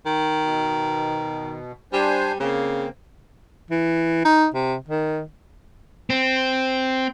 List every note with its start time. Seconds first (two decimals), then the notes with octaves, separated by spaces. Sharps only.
0.06 D#3
0.41 B2
1.93 G3 D4 C5 G#5
2.40 C#3 A#3 C4
3.71 E3
4.25 D#4
4.54 C3
4.88 D#3
6.10 C4